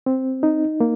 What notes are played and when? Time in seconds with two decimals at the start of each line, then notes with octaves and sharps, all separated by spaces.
0.06 C4
0.43 D#4
0.80 A#3